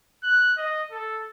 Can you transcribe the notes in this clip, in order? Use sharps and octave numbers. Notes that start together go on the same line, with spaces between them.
F#6
D#5
A4